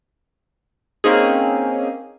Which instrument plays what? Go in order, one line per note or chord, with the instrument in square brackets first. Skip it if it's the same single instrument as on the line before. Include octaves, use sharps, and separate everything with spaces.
[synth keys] A#3 C4 C#4 D#4 G#4